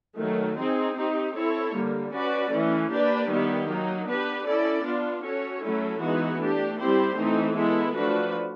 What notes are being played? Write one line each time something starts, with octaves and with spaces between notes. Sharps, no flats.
D#3 F#3 A3
C4 D#4 G#4
C4 D#4 G4
C4 E4 A4 C#5
D3 G3 A#3
C#4 F#4 B4 D5
E3 A3 C#4
A#3 D4 G4 B4 D5
D#3 G3 B3 E4 G4
F#3 A#3 D#4
B3 D4 G4 B4
C#4 E4 A4 D5
B3 D4 F4
C#4 F#4 A4 C#5
F#3 A3 C#4 E4 A4
E3 G#3 B3 D#4 F#4
A3 D4 G4
G3 C4 E4 G4 C5
E3 A3 C4 D#4
G#3 B3 E4 A4
F3 A3 D4 F#4 B4